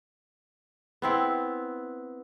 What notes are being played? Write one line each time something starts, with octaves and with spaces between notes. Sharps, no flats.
B3 C4 E4